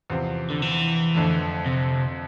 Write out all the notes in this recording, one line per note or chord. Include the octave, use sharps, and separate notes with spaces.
E2 C3 F3 C4
D3
E3
F2 D3 A3
C3